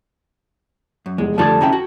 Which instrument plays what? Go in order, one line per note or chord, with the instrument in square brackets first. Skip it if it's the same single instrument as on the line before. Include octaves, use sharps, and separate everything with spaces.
[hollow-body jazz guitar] F#2
[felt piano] F1 E2 [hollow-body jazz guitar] G#3
[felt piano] F2 D3 G#6 [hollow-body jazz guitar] G3 A3 D5 [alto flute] A5
[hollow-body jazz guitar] C3 C#4 E4 [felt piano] G5 A#5
[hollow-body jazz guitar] F#4